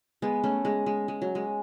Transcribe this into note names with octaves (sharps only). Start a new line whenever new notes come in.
G#3 B3
A3 C#4
G#3
G#3
G#3
F#3
G#3